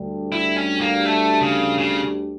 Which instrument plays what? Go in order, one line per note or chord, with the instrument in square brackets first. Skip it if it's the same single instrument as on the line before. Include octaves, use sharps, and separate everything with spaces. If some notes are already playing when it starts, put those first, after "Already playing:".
Already playing: [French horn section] D2 D3 G3
[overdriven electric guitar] E4
C#4
A#3
A3
C#3
C#3